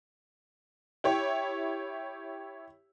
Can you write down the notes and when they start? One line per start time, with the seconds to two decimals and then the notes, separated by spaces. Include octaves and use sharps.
1.04 E4 G4 C#5